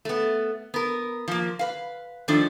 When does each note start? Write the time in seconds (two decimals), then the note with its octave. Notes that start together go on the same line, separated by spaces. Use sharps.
0.05 A3 B3
0.74 B3 A#4
1.28 F3 A#3
1.59 B4 F5
2.28 D#3 F3 A3 D4